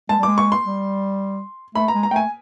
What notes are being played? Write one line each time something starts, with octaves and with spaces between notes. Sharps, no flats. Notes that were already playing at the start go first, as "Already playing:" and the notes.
G#3 A5
G3
G#3 D6
C#6
C6
G3
A3 B5
A#5
G#3
A#5
A3 G5 G#5